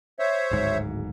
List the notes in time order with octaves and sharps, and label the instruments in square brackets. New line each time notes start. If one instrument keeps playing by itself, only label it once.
[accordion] C5 C#5 E5
[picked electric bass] D1 G#1 G#2